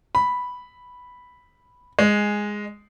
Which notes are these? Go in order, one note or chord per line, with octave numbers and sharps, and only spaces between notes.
B5
G#3